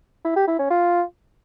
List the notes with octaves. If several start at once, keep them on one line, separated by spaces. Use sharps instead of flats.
E4
G4
E4
C#4
F4